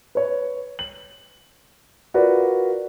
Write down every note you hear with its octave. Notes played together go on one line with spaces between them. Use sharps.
B4 C#5
F#7
F4 F#4 A#4 B4 D5